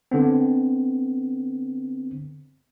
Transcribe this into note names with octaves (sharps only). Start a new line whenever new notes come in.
D3 B3 C4